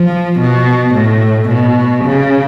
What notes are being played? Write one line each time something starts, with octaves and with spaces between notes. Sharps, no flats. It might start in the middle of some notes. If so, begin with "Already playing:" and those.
Already playing: F3
B2
A2
B2
C#3